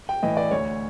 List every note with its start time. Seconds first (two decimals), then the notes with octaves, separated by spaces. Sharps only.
0.09 G5
0.23 A2 E3 D#5
0.37 D5
0.51 D2 C#5